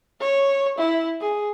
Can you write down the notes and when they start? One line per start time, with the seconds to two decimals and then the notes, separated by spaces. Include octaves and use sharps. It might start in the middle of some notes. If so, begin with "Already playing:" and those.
0.20 C#5
0.78 E4
1.20 G#4